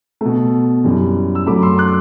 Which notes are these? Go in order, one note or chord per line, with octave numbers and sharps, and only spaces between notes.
B2 A3
F#2 E3 G3
E6
F#2 F#3 A3 B5 D6
C6 E6
D6 F#6